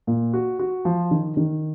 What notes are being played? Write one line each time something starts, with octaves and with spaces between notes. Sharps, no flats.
A#2
F#4
F#4
F3
D#3
D#3